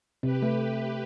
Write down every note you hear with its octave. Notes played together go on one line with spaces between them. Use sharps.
C3 G4 B4
A3